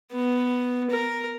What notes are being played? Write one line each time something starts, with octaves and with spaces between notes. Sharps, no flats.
B3
A#4